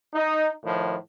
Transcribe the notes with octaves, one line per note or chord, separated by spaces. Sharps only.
D#4
A2 D#3 F3